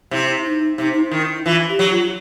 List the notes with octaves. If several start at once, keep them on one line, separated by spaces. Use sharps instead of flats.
C3 E4
D#4
C3 D#4
D#4
E4
D#3
E4
E3 F4
G4
F#3
F4